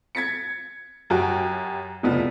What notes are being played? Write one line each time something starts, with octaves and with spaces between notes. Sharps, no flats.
G#6 A6 B6 C#7
F#2 F#4 G4 G5
F1 C#2 B3